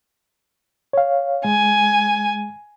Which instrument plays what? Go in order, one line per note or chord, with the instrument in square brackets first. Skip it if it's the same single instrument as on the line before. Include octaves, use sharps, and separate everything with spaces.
[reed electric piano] C#5 F5
[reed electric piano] G#3 [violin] G#5